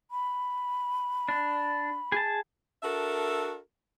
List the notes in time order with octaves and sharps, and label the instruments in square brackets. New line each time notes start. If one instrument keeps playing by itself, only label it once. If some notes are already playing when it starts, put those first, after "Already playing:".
[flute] B5
[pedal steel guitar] D4
G#4 A5
[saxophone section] D4 F#4 A4 A#4 E5